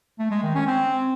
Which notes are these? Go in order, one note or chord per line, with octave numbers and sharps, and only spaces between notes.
A3
G#3
D#3
C#4
C4